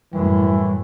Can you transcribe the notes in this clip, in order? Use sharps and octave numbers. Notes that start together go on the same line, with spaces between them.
F#2 A2 E3 G3